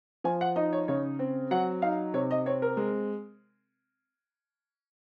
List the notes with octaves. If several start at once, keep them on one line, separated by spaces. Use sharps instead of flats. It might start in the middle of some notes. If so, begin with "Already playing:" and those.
F3 G#5
F#5
D#4 D#5
C#5
C#3 C#5
C4
F#3 F#5
D#4 F5
C3 C#5
D#5
C4 C#5
A#4
G#3